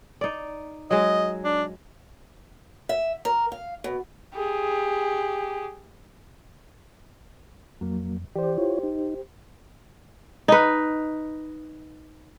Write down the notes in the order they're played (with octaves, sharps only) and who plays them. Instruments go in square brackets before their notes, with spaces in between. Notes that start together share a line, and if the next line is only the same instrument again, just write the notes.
[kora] D#4 D5
[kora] F#3 G#3 [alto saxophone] D#5
[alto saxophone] D4
[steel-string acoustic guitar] E5
A#4
F5
B2
[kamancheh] G4 G#4
[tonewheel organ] F2 [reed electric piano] F#3 A#3
[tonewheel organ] E3 D5 [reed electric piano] G4 C5
[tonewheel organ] E4 F4 C#5
D#4
[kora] D#4 B4